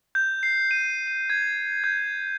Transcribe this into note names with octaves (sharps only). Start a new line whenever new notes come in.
G6
C7
D#7
D#7
G#6
G6